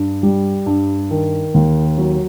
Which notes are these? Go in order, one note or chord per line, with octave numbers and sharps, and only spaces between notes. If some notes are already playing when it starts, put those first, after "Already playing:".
Already playing: G2
G3
G2
D#3
D#2
F#3